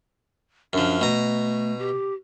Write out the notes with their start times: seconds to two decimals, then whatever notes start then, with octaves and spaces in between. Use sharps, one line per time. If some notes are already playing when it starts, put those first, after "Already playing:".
0.73 F#2 F3 D4
1.01 B2 A3 A#5
1.79 G4